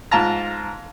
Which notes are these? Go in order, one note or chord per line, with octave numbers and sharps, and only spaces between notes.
G#2 F4 A5 A#5